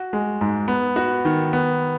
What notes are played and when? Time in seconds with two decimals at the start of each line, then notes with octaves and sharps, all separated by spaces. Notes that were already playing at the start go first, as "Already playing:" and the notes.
Already playing: F#4
0.13 G#3
0.41 G#2
0.68 B3
0.96 F#4
1.25 D#3
1.53 B3